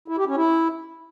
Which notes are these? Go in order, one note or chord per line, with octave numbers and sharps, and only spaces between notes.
E4
G4
C#4
E4